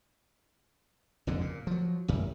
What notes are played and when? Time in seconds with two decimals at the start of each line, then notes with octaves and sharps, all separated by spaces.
1.27 F#1 F2 G#2 D3
1.41 A#2
1.67 F3 F#3
2.08 A1 F#2 G3